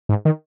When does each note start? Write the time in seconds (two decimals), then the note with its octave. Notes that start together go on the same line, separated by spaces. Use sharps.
0.09 G#2
0.25 D#3